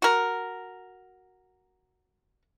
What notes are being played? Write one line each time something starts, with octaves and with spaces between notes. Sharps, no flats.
F#4 A#4